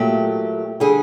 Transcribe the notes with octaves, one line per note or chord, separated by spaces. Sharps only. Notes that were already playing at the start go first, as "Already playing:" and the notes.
Already playing: A#2 F#3 A3 G4
D3 G3 G#4